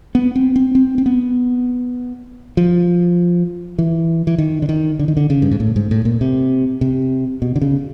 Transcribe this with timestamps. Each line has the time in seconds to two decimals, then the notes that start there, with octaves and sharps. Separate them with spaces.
0.15 B3
0.36 C4
0.56 C4
0.75 C4
0.98 C4
1.06 B3
2.57 F3
3.79 E3
4.27 E3
4.38 D#3
4.62 D3
4.69 D#3
4.99 D3
5.08 D#3
5.17 D3
5.30 C#3
5.42 G2
5.51 G#2
5.60 A2
5.76 G#2
5.91 A2
6.05 A#2
6.21 C3
6.81 C3
7.42 B2
7.56 D3
7.61 C#3